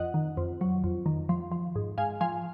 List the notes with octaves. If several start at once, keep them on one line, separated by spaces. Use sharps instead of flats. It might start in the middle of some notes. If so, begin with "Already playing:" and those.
Already playing: F2 D#5 F#5
D#3
F2
F#3
F2
D#3
F3
F3
G#2
G#2 F5 G#5
F3 F5 G#5